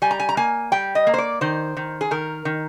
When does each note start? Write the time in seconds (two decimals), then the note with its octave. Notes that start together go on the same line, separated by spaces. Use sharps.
0.02 G3 G#5
0.11 A#5
0.20 G#5
0.29 A#5
0.37 A#3 G#5
0.72 G3 G5
0.95 D#5
1.07 A#3
1.14 C5
1.18 D5
1.41 D#3 C5
1.77 D#3
2.01 G#4
2.11 D#3 A#4
2.45 D#3